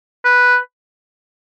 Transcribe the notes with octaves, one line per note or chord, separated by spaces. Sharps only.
B4